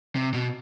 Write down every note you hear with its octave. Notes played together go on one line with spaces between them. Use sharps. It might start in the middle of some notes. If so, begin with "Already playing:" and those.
C3
B2